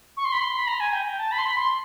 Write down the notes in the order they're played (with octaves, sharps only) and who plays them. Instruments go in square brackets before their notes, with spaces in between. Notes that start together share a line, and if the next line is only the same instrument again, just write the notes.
[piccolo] C#6
C6
B5
C6
B5
A#5
G#5
G5
G5
A5
B5
C6
B5
C6